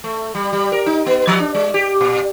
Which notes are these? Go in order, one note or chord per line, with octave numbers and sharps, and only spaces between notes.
A3
G3
G3
A#4
D#4
B3
F3
D4
G#3
G4
A#2